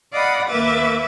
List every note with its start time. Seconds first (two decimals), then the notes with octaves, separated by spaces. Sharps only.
0.13 D5 D#5 F5 F#5 B5 D#6
0.48 D#2 A#3 B4 E5 D6 A6